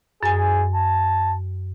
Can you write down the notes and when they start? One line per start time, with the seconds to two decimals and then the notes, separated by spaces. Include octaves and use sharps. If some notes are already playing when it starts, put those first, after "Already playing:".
0.23 F#2 G#4 G#5
0.75 A5